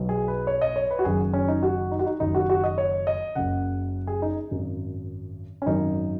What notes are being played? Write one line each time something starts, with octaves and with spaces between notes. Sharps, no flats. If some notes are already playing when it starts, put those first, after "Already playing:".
Already playing: B1 B2 F#3
G#4
B4
C#5
D#5
C#5
B4
F#4
F#1 F#2 D#3 F#3 G#4
C#4
D#4
F#4
D#4
F#4
D#4
F#1 F#2 D#3 F#3 D#4
F#4
F#4
D#5
C#5
D#5
F#1 F#2 C#3 F#5
G#4
D#4
G#1 F#2 F#3
C#4
G#1 F#2 D#3 F#3 D#4